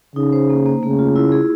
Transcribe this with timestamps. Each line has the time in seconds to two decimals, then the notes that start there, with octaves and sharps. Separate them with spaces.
0.16 C#3 D#4
0.33 C5
0.49 A#3
0.66 A#3
0.82 C#3 A3
0.99 F4
1.16 E4
1.32 G#4